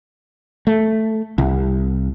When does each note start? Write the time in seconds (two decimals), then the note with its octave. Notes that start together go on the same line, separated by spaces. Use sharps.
0.67 A3
1.38 C2